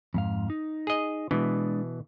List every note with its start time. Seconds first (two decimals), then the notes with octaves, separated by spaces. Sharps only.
0.14 F2 G#2 F5
0.50 D#4
0.87 G#4 D#5
1.31 B2 E3 G#3 D4